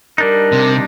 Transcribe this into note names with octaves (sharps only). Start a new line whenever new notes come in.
G3 D4 D#4 A#4
C3